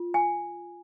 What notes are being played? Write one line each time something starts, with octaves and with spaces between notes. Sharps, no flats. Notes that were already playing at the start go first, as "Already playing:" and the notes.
Already playing: F4
G#5